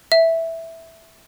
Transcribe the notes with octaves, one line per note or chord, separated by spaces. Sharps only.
E5